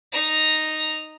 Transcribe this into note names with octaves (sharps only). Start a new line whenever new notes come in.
D#4 A#5